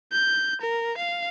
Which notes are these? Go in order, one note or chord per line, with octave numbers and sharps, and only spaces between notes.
G6
A#4
F5